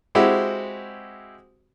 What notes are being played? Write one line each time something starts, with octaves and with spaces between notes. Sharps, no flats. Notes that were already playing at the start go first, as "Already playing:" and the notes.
G#3 C4 E4 F#4 G4